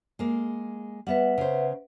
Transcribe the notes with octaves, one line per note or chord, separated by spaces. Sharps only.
G#3 A#3
G3 B3 B4 E5 F#5
C#3 C5